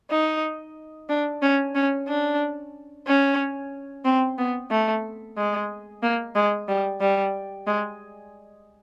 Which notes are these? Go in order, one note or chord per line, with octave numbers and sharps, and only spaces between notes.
D#4
D4
C#4
C#4
D4
C#4
C4
B3
A3
G#3
A#3
G#3
G3
G3
G#3